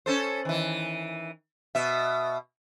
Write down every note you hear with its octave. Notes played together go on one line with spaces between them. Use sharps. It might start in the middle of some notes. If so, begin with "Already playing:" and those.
C#4 A4 C5
D#3 E3
B2 E5